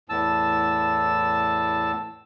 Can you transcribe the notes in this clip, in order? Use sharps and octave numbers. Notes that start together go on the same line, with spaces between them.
E2 A2 A5 E6